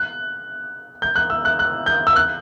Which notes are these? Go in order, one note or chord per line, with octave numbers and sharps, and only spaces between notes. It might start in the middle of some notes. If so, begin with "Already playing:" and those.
Already playing: F#6
G6
F#6
E6
F#6
F#6
G6
E6
F#6